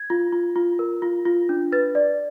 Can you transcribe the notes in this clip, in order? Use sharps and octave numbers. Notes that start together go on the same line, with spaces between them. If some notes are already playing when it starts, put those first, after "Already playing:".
Already playing: G#6
F4
F4
F4
A#4
F4
F4
D4
B4 A6
D5